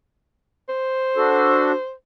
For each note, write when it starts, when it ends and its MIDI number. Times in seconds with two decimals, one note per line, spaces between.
0.69 1.93 72
1.17 1.72 62
1.17 1.72 66
1.17 1.72 69